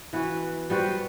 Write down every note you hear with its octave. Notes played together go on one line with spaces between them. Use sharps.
E3 B3 F#4
G3 B3 F#4 C5